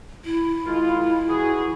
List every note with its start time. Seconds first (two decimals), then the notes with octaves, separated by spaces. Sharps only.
0.25 E4
0.66 D#3 G#3 F4
1.28 E3 F#4 G#4